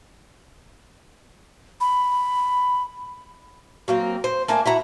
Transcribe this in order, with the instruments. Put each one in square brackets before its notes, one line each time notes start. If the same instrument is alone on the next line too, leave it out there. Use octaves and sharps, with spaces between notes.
[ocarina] B5
[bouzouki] F#3 A#3 C4
C5
A3 A#3 D4 G#5
E4 F#4 A#5